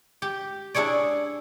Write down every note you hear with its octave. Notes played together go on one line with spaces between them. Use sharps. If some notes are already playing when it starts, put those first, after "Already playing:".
G4
D4 E4 G#4 C#5 D5